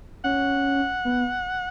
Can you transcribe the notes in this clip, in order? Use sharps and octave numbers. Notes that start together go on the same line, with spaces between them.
C#4 F#5
B3